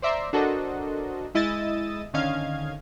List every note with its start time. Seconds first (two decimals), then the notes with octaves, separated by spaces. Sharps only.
0.02 C5 D5 E5 A#5 C6
0.33 D4 F#4 A4 A#4 C5 D#5
1.35 G#3 E4 D#5 D#6 E6 A6
2.14 D3 D#3 C#4 D#5 F5 G#6